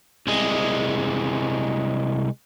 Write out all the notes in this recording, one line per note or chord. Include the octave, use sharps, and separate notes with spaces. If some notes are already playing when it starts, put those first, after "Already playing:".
C2 G#3